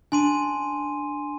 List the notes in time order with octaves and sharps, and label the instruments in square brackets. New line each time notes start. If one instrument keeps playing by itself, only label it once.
[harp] D4 [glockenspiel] G#5 C6 D#7